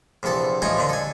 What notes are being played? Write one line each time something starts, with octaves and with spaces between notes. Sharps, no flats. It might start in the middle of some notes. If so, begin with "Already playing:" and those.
A#1 E2 C3 A4 A5
A1 F3 D#4 F4 G#5
A#2 D3 D4
A4 G#5